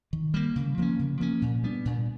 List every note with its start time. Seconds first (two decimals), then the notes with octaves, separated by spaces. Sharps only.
0.13 D#3
0.34 G3 A#3
0.56 C#3
0.78 F3 A#3 C#4
0.99 C#3
1.20 F3 A#3 C#4
1.42 A#2
1.63 G3 B3 D4
1.85 A#2